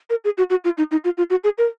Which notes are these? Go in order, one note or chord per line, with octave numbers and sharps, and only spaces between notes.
A#4
G#4
F#4
F#4
F4
D#4
D#4
F4
F4
F#4
G#4
A#4